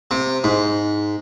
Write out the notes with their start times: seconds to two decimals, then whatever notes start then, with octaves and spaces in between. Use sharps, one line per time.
0.11 C3
0.44 G#2